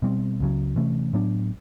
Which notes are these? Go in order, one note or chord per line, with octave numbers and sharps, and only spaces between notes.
B2 G3 C4
C#2 C#3 F#3
C3 E3 A3 C#4
A2 F#3 B3 D4